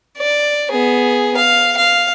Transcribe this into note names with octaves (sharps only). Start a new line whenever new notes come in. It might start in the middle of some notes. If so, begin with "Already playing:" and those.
D5
B3 G#4
F5
F5